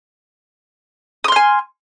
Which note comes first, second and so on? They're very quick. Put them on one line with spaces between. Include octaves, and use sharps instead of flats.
D#6 C6 F6 G#5